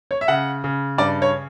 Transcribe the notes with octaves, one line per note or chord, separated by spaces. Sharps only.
C#5
E5
C#3 F#5
C#3
G2 D5
C#5